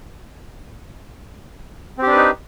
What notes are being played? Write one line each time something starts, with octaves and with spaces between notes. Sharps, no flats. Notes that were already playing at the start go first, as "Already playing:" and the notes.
C4 D4 D#4 G4 B4